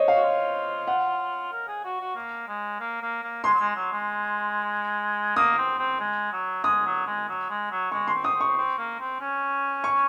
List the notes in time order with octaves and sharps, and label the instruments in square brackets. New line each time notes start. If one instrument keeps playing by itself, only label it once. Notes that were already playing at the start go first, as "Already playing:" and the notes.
Already playing: [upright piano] C5 C#5 D#5
F5
[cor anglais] F#4
F4
[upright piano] F#5
[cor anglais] A#4
G#4
F#4
F#4
A#3
G#3
A#3
A#3
A#3
[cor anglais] G#3 [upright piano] C6
[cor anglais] F#3
G#3
F#3
G#3
[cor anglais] A#3 [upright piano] D#6
[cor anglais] C4
C4
G#3
F#3
[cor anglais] G#3 [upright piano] D#6
[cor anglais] F#3
G#3
F#3
G#3
F#3
[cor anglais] G#3 [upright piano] C#6
[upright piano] C6
[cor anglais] C4
[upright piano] D#6
[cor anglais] C4
[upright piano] C#6
[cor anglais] C4
A#3
C4
C#4
[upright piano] C#6